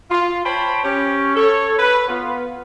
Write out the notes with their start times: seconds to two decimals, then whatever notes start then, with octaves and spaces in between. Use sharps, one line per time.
0.10 F4
0.45 C5 C#5 G5 A5 B5
0.83 C#4 G4 C#5
1.36 A4 C#5
1.78 B4
2.09 B3 F4